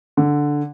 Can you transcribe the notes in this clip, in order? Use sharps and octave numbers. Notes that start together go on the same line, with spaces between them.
D3